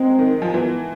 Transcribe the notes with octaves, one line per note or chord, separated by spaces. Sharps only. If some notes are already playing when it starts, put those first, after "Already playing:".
Already playing: F#3 G#3 C4
D#3
F3
E3 B3